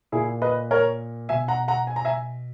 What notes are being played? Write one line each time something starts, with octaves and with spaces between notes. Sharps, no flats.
A#2 E4 G#4
B4 D#5
A#4 C#5
B2 E5 G#5
F#5 A#5
F#5 A#5
G#5
A#5
E5 G#5